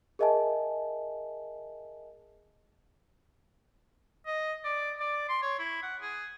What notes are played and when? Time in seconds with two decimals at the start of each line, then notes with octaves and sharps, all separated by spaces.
0.19 G#4 A#4 D#5 E5 G#5 A5
4.27 D#5
4.64 D5
4.99 D5
5.29 C6
5.42 C#5
5.59 E4
5.83 F#5
6.01 G#4